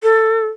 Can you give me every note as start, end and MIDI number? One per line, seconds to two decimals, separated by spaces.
0.03 0.46 69